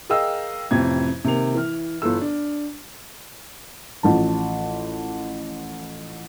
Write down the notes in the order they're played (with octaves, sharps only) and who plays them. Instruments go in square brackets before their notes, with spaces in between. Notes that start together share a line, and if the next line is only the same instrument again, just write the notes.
[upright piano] G#4 A#4 D#5 F5 G5 E6
A1 F2 C3 G#6
C3 D#3 A#3 F7
E3 F6
G1 E3 F4 A4 E6
D4
A1 F3 A5